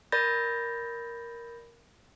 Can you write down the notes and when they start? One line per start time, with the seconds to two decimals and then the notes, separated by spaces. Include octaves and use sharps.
0.12 A#4 D5 B5 G6 A6 A#6